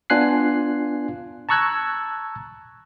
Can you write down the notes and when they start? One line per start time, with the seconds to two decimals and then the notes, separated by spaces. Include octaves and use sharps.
0.10 B3 D4 F4 G#5 F#6 C7
1.49 A5 A#5 C#6 E6 F#6 G#6